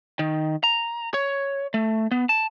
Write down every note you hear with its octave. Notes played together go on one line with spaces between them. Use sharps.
D#3
A#5
C#5
A3
B3
A5